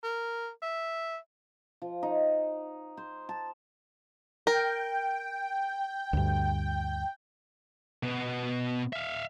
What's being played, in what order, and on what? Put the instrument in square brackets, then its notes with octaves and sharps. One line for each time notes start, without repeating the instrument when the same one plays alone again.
[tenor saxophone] A#4
E5
[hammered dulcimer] F3
D#4
C5
A5
[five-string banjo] A#4 [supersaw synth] G5
[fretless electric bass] D2 G2
[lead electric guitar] B2 B3
E5 F5